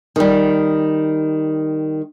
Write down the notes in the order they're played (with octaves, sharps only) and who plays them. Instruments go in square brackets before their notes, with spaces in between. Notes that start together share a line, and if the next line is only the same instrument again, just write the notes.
[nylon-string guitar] D#3 G3